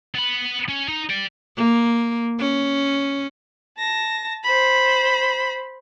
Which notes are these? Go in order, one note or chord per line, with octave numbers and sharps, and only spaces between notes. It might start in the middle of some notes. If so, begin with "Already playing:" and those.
B3 B5
C#4
D#4
D5 G5
A#3
C#4
A5 A#6
C5 B5